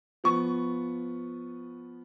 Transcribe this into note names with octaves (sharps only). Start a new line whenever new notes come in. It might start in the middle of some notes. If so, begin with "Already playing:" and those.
F3 B3 C#6